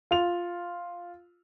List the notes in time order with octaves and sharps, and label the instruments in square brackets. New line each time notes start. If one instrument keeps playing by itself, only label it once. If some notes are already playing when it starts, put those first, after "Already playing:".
[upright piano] F4 F7